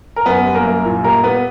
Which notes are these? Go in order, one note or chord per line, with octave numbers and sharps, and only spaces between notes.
A#4
F#2 B3 B4
G3
A#3 A#4
F#2
A#2
G3 A#3 A#4
G3 B3 B4